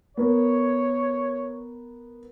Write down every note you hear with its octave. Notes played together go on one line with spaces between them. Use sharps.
B3 A#4 C#5